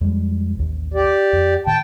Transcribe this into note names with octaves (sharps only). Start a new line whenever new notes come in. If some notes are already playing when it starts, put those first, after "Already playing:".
F2 G3 G#3
A1 D#2
G4 D5
F2
A2 D#3 G5 A5